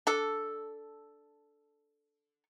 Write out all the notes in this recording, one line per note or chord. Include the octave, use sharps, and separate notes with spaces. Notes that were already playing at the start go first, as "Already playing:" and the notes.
D4 A4